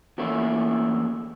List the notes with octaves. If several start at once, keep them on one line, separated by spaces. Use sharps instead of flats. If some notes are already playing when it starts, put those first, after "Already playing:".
E2 F3 A3 A#3 C#4 E4